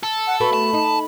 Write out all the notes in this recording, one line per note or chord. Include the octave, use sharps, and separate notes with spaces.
A4
F#5
A3 B3 F#4 B5
A5
D#4